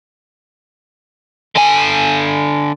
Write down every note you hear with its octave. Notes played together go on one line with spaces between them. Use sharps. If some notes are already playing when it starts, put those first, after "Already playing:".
D3 G#5